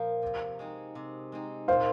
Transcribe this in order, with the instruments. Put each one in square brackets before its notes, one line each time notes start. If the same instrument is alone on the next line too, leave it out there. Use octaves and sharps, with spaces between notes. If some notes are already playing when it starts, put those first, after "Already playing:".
Already playing: [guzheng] A#2 F3 A#3
C3
G#3 C4 D#4
C3
G#3 C4 D#4
[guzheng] A#2 [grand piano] C5 F5